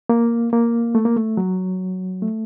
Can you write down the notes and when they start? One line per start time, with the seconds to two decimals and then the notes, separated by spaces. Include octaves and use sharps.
0.09 A#3
0.53 A#3
0.95 A3
1.05 A#3
1.16 A3
1.37 F#3
2.22 A3